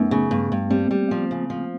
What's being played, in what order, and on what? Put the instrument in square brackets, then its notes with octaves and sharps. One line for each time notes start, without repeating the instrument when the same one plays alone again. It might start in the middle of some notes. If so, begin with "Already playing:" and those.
Already playing: [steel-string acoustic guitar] F#2 [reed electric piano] A3 B3 C#4 D#4
[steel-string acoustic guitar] C#3
G2
G2
[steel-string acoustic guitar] G3 [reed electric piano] A#3 C4
[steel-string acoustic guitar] G3
F3
C#3
F3